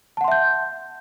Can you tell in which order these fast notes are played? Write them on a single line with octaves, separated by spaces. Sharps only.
A5 F#5 C6 E5 G6